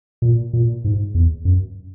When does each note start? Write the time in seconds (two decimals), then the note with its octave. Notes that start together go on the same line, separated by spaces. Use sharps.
0.22 A#2
0.53 A#2
0.84 G#2
1.15 E2
1.45 F#2